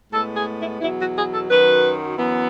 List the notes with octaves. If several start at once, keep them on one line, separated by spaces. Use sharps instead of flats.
A2 G#3 B3 A4
G#4
E4
E2 B2 F#3 E4
F#4
G#4
A4
F#2 D#3 F#3 B4
F#2 E3 B3